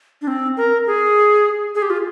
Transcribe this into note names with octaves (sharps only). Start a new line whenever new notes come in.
D4
C4
A#4
G#4
G#4
G4
F4